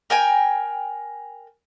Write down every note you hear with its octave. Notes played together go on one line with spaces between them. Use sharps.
A#4 G5 G#5